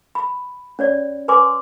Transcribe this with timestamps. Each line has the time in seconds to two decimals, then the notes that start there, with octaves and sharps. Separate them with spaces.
0.15 B5
0.79 C#4 C#5 D5
1.28 B4 G#5 C6 D6